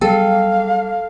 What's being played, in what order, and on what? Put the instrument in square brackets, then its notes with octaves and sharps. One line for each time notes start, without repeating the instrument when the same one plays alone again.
[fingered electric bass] F#3 G3 B3 [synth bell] G#4 G5 [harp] A4 [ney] F5